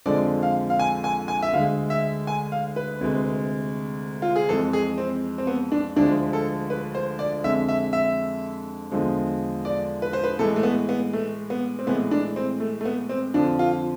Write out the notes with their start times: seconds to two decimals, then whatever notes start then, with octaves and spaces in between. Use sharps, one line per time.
0.06 F2 D3 F3 G#3 D5
0.43 F5
0.70 F5
0.79 G#5
1.04 G#5
1.28 G#5
1.42 E5
1.53 D2 D3 G#3 F5
1.90 E5
2.27 G#5
2.52 F5
2.76 B4
3.01 D2 C3 G#3
4.22 F4
4.36 G#4
4.49 F2 E3 G#3 A4
4.73 G#4
4.98 C4
5.38 C4
5.47 B3
5.72 D4
5.96 D2 D3 F3 G#3 D4
6.33 A4
6.70 B4
6.94 C5
7.19 D5
7.44 F2 D3 G#3 E5
7.69 E5
7.93 E5
8.92 E2 D3 F3 G#3
9.65 D5
10.02 B4
10.13 C5
10.24 B4
10.39 A2 E3 G#3 A4
10.56 A3
10.63 B3
10.89 B3
11.13 A3
11.50 B3
11.79 C4
11.87 A2 E3 G#3 B3
12.11 D4
12.36 C4
12.60 A3
12.81 A3
12.85 B3
13.09 C4
13.34 F2 D3 F3 D4
13.59 F4